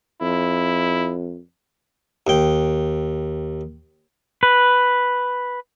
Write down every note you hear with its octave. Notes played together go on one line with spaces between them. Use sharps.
F2 E4
D#2 G5
B4